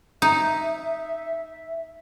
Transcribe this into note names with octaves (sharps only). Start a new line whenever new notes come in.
D#4 E5